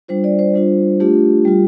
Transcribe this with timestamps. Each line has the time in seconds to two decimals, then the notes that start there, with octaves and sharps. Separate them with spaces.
0.08 G3 D4 F4 C5
0.24 D5
0.39 C5
0.54 G3 D4 F4
1.00 A3 D4 F4 G4
1.45 G3 F4